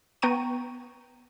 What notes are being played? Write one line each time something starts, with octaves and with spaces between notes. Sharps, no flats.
B3 G5 A#5 C#6 D#7